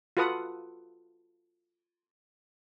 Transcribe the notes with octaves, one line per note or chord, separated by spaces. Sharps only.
F4 F#4 A4 B4 F#5 D#6